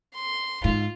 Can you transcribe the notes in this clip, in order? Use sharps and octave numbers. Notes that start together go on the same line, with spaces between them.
C6
G#2 F4